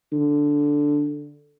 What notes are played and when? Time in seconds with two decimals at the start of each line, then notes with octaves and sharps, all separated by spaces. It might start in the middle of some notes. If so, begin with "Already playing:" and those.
0.12 D3